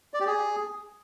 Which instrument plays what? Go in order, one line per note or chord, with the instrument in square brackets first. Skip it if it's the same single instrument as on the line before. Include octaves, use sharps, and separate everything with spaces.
[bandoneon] D5
G4
G#4